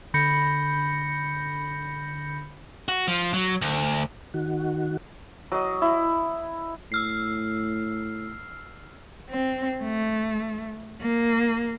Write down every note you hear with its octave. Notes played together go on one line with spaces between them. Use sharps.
D3 B5 G6 A#6 C#7
F#4
F3
F#3
D2
D#3 F#4
F#3 D#5
E4
A2 E6 F6 C7
C4
A3
A#3